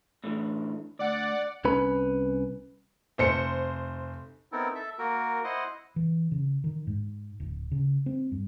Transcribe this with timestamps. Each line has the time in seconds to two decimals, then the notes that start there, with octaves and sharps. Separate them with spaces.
0.24 A2 D3 E3
0.99 D2 D5 F#5
1.65 C2 C#4 B4 B5
3.18 F1 C5 C#7
4.52 B3 C4 D#4 E4 A4 A#4
4.75 A4 E5
4.99 A#3 F#4 A#4
5.44 E4 C5 D#5 F#5
5.96 E3
6.31 C#3
6.64 D#3
6.87 G#2
7.40 D1
7.72 C#3
8.06 C4
8.32 G2